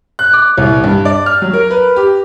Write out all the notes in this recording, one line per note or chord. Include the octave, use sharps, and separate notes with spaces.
F#6
D6
C2
G2
D5
F6
F#3
A#4
B4
G4